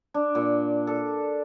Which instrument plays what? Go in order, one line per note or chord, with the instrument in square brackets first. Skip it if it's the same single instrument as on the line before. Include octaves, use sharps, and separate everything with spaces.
[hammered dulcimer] D4
A#2
A4